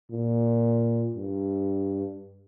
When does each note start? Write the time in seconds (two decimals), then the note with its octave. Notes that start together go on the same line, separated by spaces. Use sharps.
0.11 A#2
1.15 G2